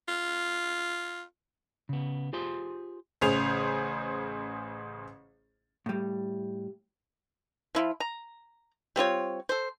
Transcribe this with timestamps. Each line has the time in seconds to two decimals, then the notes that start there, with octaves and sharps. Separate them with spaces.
0.09 F4
1.89 C#3 B3
2.33 F4 G4 G#4 C5 C6
3.21 A1 C#3 G#4 C5 F7
5.86 A2 G3
7.75 F3 E4 F4
8.00 A#5
8.96 G3 C4 F4 C#5
9.49 A4 C5